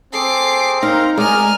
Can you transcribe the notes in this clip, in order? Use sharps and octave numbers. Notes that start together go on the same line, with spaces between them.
C4 G#4 A4 D6 C7
D#4 A#4 F5 A#5 C6
G#3 A#4 D5 D#5 G#5 A#5 F6